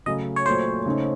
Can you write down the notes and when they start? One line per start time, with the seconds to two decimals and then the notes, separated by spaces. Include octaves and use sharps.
0.06 C#3 F#3 A3 C#4 D#5
0.36 C#5
0.46 A#2 F#3 A3 C5
0.86 C#3 A3 D#4